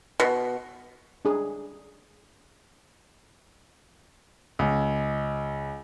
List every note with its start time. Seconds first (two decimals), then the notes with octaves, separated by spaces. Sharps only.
0.20 B2
1.25 D4 G#4
4.59 C#2